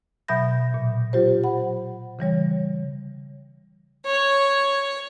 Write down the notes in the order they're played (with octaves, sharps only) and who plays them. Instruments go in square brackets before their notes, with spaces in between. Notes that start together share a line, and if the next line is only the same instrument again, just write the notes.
[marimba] B2 F#3 E5 B5 G6 A#6
A#2
F#3 F4 G4 C5
F#5 B5
C#3 E3 G3 C#5
[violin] C#5